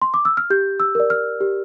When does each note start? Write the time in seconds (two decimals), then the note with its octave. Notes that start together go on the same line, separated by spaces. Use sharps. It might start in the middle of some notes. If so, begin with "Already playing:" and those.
0.02 C6
0.14 D6
0.25 E6
0.37 F6
0.50 G4 G6
0.80 E6
0.95 A#4 D5
1.10 F6
1.41 G4